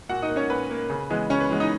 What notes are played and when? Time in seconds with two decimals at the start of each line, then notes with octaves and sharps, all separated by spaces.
0.09 A#2 F#4 F#5
0.22 D#4 D#5
0.29 A#3
0.36 C#4 C#5
0.50 A#2 B4
0.70 A#3
0.90 C#3
1.10 E3 G#3 B3
1.30 C#3 C#4 C#5
1.40 B4
1.50 E3 G#3 B3
1.60 D#4 D#5